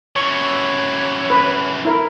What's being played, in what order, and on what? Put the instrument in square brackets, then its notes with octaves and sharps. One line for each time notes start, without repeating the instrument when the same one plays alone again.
[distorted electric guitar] F#2 E3 [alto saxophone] C#5 [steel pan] C#6
[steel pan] B4
E4 A#4